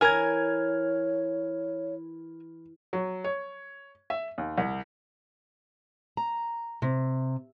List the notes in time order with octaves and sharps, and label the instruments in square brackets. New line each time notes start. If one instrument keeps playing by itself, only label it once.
[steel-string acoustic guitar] E3 [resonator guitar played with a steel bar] A#4 G#5 [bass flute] C#5 [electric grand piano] F6 G#6
[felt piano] F#3
C#5
E5
D#2
C2
[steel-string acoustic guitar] A#5
C3